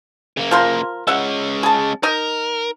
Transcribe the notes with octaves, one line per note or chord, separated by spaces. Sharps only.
C#3 A#3
F3 A#4 C6
G#3 C#4 E5 F#5
G#4 A5
D#4 A#4 D#5